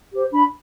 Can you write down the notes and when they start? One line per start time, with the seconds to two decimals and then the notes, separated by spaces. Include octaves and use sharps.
0.13 G4 C5
0.32 D4 B5